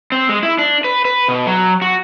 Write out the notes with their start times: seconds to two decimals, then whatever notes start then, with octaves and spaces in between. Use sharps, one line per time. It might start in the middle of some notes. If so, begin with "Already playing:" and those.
0.12 C4
0.29 G#3
0.43 E4
0.59 D4
0.84 B4
1.05 B4
1.28 B2
1.47 F#3
1.82 F#4